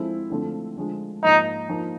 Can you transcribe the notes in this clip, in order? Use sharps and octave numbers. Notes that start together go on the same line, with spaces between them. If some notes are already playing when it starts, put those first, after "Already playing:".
Already playing: F3 G#3 C4 E4 A4
D3 F3 A3 C4
D3 F3 G#3
G#2 F3 A#3 D#4
F3 A#3 D#4